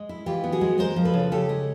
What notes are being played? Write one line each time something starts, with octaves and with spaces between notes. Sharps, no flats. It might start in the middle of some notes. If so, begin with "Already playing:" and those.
Already playing: G#3
E4
E3 F4 G4
B3
F#4 G#4
G#3
G#3 A#4 C5
F3
A4 B4
C#3
C#3 G4 A4
G#3